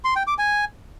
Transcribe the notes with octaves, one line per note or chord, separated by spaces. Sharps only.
C6
G5
D6
G#5